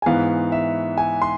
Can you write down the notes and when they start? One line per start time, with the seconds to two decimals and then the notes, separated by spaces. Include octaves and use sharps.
0.02 G#5
0.06 G#2 E3 B3 F5
0.52 E5
0.98 G#5
1.22 C6